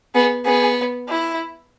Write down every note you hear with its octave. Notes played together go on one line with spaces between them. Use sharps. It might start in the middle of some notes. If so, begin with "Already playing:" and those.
B3 G#4
B3 G#4
E4